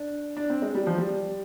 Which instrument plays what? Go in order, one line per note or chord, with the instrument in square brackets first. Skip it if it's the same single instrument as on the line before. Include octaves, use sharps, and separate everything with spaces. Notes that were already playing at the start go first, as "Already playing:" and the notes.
Already playing: [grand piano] D4
D4
C4
G#3
G3
F3
G3